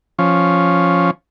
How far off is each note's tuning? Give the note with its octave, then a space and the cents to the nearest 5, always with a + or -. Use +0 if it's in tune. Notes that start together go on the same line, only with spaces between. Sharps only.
F3 +0 C#4 +0